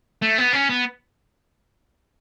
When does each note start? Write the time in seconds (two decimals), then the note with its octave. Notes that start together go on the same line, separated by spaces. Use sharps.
0.22 A3
0.38 B3
0.53 C#4
0.69 B3